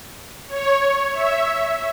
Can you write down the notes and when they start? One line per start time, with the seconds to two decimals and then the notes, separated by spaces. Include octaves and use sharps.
0.48 C#5
1.13 E5